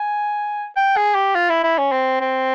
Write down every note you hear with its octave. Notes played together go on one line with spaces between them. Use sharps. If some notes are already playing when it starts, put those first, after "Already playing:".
Already playing: G#5
G5
G#4
G4
F4
E4
E4
C#4
C4
C4